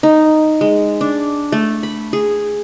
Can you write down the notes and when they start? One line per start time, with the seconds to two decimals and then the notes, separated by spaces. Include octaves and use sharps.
0.03 D#4
0.61 G#3
1.01 D4
1.52 A3
1.83 B5
2.13 G#4